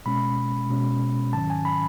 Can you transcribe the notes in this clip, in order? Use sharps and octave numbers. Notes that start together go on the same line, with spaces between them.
B2 G#3 C#4 B5
B2 G#3 C#4
G#2 D#3 F#3 C#4 A5
G#5
B5